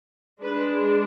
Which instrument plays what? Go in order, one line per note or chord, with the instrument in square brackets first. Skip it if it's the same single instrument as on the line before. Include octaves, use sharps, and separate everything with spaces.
[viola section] G#3 D4 B4